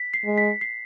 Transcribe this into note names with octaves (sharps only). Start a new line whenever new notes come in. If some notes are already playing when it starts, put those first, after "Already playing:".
Already playing: B6
C7
G#3
B6
C7